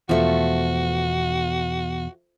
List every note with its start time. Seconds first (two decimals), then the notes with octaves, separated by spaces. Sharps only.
0.09 E2 B2 F3 A3 F#4 C#6